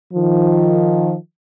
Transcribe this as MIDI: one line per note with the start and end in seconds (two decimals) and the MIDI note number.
0.14 1.15 51
0.14 1.15 53